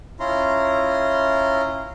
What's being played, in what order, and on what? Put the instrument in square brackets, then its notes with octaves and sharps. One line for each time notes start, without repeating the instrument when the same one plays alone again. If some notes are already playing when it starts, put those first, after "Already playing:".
[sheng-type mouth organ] C#4 E4 F4 A#5 C6